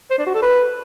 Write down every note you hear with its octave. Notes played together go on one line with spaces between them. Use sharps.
C5
D4
F#4
A4
B4